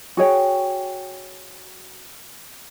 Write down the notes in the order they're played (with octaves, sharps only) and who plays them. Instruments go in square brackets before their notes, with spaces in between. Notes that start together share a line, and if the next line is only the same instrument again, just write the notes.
[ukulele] F#4 G#4 C#5 G5